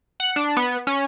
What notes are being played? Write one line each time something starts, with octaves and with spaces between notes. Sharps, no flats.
F#5
D4
B3
C#4